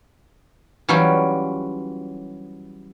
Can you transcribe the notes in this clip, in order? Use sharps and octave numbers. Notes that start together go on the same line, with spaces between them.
E3 F#3 G3 C#4 F4 G4